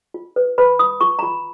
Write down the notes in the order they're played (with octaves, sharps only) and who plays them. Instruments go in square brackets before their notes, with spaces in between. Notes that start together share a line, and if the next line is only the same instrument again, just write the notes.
[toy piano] F4
B4
B4 B5
B4 D#6
F4 C#6
A#5
F4 B5